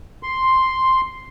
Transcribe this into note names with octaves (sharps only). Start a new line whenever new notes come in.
C6